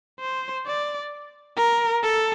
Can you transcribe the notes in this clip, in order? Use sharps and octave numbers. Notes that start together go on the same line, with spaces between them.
C5
D5
A#4
A4